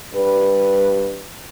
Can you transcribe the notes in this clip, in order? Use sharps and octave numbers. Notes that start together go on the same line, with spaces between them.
G2 G3 G4 B4